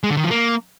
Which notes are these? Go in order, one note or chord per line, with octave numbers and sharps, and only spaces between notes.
G#3
D3
D#3
F3
A#3